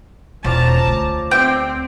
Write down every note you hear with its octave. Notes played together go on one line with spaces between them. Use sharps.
E1 F3 C#4 D5 A5 A#5
D2
C4 G4 C5 E5 G5